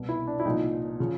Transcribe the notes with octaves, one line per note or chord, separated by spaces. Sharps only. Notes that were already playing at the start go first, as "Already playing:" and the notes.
Already playing: C2 B2
E4
D4
E4
C2 A#2 F3 D#4
C#3 F3